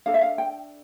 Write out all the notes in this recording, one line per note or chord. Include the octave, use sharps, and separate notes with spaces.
D4 A4 F5
E5
F5
G5